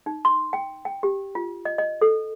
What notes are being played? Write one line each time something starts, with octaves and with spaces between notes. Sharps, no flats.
D#4
C6
G5
G5
G4
F4
D#5
D#5
A4